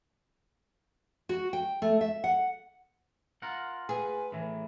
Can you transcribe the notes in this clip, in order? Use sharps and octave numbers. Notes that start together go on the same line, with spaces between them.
F#4
G5
A3
E5
F#5
F4 A#4 F#5
G#4 B4
A2 E3